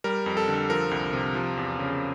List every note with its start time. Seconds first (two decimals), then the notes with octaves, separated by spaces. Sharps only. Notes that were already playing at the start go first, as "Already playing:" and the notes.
0.04 G3 A#4
0.26 F2
0.37 A4
0.48 D3
0.70 F3 A#4
0.91 C2
1.13 C3
1.35 F3
1.57 E2
1.79 C#3